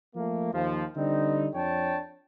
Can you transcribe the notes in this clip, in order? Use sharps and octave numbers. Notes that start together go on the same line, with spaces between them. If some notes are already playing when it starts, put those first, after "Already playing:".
F3 A3 A#3
D#2 F3
D3 G3 C4 D#4
F2 D4 C#5 G5 A5